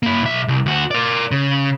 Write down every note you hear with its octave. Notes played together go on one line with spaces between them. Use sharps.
A#3 E4
B1 E5
C2
D2 F#4
A#4 D5
C#3